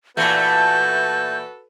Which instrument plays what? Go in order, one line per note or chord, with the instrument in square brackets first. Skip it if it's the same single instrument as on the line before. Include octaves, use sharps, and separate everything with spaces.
[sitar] A#2 E3 A3 [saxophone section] F#4 A4 B4 [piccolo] G6